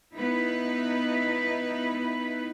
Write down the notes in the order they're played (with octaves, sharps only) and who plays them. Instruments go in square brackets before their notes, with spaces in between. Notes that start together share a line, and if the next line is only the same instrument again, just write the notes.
[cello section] B3 D#4 E4 B4